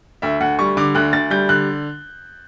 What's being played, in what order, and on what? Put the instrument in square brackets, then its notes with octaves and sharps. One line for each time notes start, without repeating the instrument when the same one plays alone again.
[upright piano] D2 E5
D2 F#5
G3 C#6
D3 D6
D2 F#6
D2 A6
G3 G6
D3 F#6